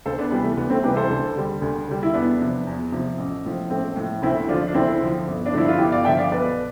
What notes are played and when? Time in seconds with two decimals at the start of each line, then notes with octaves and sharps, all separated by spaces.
0.06 D2 A4 C5
0.18 B3 D4
0.31 C3 E3 G3 B3
0.44 A3
0.57 D2 B3
0.70 A3 C4
0.83 C3 E3 G3 G4 B4
0.96 A4 C5
1.10 D2
1.36 D3 G3
1.62 D2
1.88 D3 G3
2.03 E4
2.13 E2 B3 D4
2.40 C3 F3
2.67 E2
2.92 C3 F3
3.18 A1
3.45 A2 F3
3.70 A1 A3 C4
3.96 A2 F3
4.22 D2 C4 E4
4.48 D3 F3 D4 F4
4.68 D4
4.74 D2 C4 E4
5.01 D3 F3
5.28 G1
5.46 D4
5.53 G2 D3 F3 E4
5.68 F4
5.79 G1 E4 G4
5.92 D5 F5
6.05 G2 D3 F3 E5 G5
6.18 D5 F5
6.31 B1 B4 D5